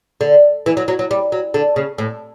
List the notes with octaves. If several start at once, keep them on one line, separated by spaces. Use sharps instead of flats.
D3
E3
F#3
F#3
F#3
G3
F#3
D3
C#3
A2